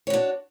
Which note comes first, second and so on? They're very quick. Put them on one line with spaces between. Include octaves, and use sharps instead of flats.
C#5 F#4 D4